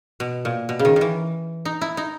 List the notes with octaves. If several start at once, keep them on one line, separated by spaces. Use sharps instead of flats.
B2
A#2
B2
C#3
D#3
D#3
E3
D#4
E4
D#4